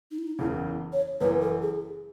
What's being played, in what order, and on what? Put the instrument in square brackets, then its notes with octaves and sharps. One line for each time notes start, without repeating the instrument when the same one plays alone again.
[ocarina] D#4
E4
D#4
[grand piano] F#1 E2 C#3 [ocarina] E4
[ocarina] C#5
[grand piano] F#1 F#2 E3 [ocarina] B4
[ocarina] A4
G#4